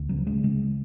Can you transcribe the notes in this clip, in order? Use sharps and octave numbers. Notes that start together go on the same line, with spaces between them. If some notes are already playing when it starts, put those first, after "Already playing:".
Already playing: D2
C#3 F#3
C#3 G#3
C#3 G#3